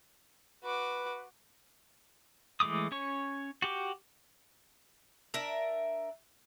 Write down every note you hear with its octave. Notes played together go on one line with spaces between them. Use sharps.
F#4 B4 D6
E3 G#3 A3 D6 D#6
C#4 C#5 C#6
F#4 G4 D6
D4 A#4 E5